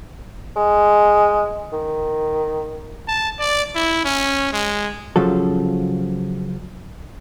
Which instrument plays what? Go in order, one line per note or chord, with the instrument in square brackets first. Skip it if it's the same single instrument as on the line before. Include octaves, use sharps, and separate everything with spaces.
[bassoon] G#3
D#3
[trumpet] A5
D5
E4
C#4
G#3
[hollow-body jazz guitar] C#3 F3 F#3 A4